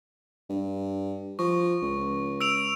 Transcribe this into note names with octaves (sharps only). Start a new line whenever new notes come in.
G2
F3 C#6
C#2
E6 D7 F7